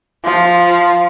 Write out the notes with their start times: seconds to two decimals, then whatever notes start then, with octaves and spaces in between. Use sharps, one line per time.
0.25 F3